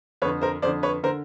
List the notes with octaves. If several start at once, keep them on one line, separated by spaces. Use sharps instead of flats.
F2 D3 B4 C#5
A#4 C5
F2 D3 C5 D5
B4 C#5
D3 A#4 C5